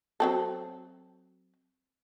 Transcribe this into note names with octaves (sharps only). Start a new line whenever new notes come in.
F#3 C4 A4